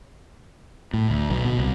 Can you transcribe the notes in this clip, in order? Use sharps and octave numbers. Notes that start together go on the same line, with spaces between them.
A2
D2
B1
B2
C2